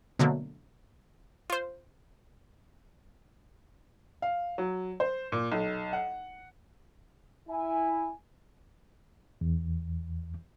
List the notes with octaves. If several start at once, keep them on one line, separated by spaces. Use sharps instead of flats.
B2 D3 F#3 A3 A#3
F4 C5
F5
F#3
C5
A#2
B1
F#5
E4 G#5
E2